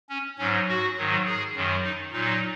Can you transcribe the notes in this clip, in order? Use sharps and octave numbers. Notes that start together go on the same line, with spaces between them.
C#4
G#2 F#3 C#4
F#4
G#2 D#3 F#3
G#4
F#2 D#3 F#3
D#4
A#2 F#3 D#4